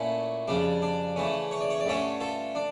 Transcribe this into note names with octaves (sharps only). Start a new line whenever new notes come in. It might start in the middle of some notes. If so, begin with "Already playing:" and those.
Already playing: A#2 A3 C#4 E4
F2 C#3 G3 D4
D4
C#3 E3 A3 C#4
C#5
D5
C#5
D5
G2 D3 A3 C#4 A4 C#5
F4 A4
D4